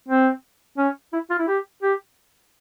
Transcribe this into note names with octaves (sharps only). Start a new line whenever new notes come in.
C4
C#4
E4
F4
E4
G4
G4